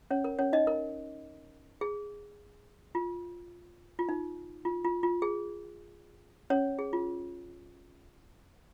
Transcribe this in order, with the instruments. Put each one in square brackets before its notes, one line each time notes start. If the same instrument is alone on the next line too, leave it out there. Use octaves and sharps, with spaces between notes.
[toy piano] C#4 C#5
A#4
C#4 C#5
D#4 D#5
A#4
G#4
F4
F4
D#4
F4
F4
F4
G#4
C#4 C#5
G#4
F4